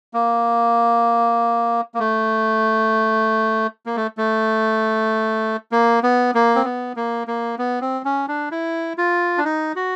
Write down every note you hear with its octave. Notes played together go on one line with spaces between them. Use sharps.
A#3
A#3
A3
A#3
A3
A3
A#3
B3
A#3
C4
B3
A#3
A#3
B3
C4
C#4
D4
E4
F4
D4
D#4
F#4